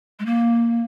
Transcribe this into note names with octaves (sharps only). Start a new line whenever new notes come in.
G#3
A#3